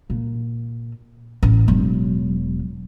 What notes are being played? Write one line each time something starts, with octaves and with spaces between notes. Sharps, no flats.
A#2
A1
E1 F#3